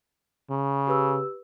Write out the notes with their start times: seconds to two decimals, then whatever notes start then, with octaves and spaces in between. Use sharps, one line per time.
0.50 C#3
0.87 G4 B4 E6